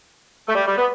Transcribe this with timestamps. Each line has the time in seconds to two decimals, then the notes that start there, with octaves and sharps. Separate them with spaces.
0.48 A3
0.55 G3
0.67 G3
0.77 B3